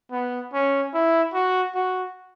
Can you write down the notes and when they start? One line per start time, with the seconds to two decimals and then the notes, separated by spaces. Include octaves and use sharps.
0.12 B3
0.53 C#4
0.94 E4
1.34 F#4
1.74 F#4